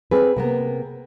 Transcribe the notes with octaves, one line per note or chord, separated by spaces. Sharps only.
C4 G#4 B4
C3 A#3 B3